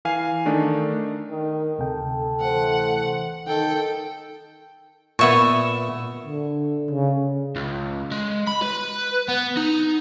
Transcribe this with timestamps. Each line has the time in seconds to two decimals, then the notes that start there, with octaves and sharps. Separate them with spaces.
0.05 E3 F5 G#5 C7
0.46 D#3 A3 D4 D#4
1.30 D#3
1.79 D2 C3 A4 G5
2.41 E3 A3 C5 F#5
3.47 D#3 A4 G5
5.19 A#2 B3 E5 C#6
6.25 D3
6.91 C#3
7.56 C#2
8.11 G#3
8.47 B5
8.62 B4
9.28 B3
9.57 D#4